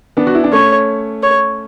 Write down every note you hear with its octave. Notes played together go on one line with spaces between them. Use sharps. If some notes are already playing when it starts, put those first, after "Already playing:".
B3 D4
F#4
E4
D4
A3 C#4 C#5
C#5